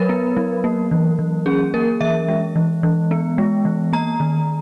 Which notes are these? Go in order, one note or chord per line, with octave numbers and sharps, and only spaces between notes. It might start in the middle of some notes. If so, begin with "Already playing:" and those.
Already playing: F#3 A#4 B4 C#5 B5
B3
F#3
A#3
E3
E3
C#4 G#4
A#3 A#4
E3 E5
G#3
E3
E3
B3
G#3
E3
A#3 A#5
D#3